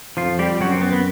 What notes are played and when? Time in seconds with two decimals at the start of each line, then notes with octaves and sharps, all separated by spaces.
0.17 F2 F3 F4
0.39 G3 G4
0.61 F#2 F#3 F#4
0.72 C4
0.82 B3
0.93 B3